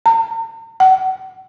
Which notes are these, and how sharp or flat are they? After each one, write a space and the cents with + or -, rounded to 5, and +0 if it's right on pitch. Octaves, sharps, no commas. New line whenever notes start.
A#5 -45
F#5 +40